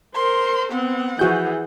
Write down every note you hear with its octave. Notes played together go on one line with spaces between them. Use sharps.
A#4 C5 C6
B3 C4 F#5
E3 F3 F#4 G#4 G6